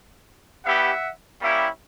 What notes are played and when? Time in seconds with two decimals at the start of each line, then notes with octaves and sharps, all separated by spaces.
0.65 G3 B3 E4 G4 E5 F#5
1.40 G3 A#3 C#4 E4 G4